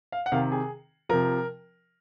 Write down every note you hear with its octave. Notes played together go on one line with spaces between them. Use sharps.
F5
F#5
C3 D#3 F5
G#4
C3 F3 A#4